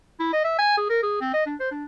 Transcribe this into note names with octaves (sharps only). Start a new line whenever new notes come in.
E4
D#5
E5
G#5
G#4
A#4
G#4
C4
D#5
D4
C5
D4